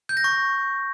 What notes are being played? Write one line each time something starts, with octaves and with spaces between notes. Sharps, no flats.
G6
A#6
C#6